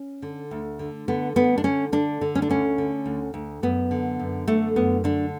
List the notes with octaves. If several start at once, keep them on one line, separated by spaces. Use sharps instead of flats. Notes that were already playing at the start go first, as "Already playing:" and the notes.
Already playing: C#4
D3
D2
D3
D3 B3
D3 B3
D4
D3 C#4
D3 D4
D3
C#4
D4
D2 C#4
D3
D2
D2
F#2 B3
D3
F#2
D3 A3
F#2 B3
D3 D4